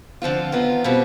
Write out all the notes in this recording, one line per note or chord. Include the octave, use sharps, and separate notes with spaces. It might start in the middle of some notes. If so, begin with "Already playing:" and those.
D3 F3 C4 F4
F2 D#3 B3 F4
B2 G3 C4 F4